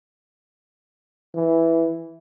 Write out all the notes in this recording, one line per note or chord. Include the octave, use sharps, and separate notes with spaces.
E3